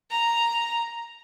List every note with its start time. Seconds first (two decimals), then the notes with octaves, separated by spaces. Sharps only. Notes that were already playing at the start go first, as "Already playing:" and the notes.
0.10 A#5